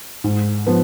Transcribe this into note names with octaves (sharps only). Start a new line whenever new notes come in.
G#2
F3 B3